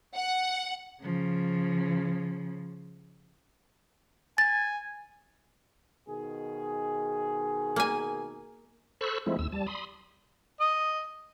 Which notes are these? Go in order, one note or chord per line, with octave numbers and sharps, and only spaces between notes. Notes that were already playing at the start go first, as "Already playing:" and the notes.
F#5
C#3 F3
G#5 A6
B2 D#3 G#4
A#3 G#5
A4 C5 B5 C#6 E6 F#6
F3 G#3 A3 C4 E4
D#2 E6
G3 A5
B5 C6 D#6
D#5